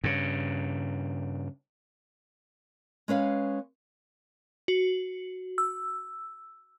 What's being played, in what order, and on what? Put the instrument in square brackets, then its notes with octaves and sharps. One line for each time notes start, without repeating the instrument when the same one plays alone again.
[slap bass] G2 C#3
[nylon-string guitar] G#3 C#4 B4 F5
[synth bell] F#4
E6